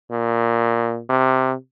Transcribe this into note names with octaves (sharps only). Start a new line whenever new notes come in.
A#2
C3